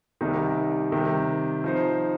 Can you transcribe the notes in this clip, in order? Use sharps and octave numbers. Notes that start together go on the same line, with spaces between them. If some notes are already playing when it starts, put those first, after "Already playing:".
C2 C3 D#3 G3 D#4
C3 D#3 G3
F3 D#4 C5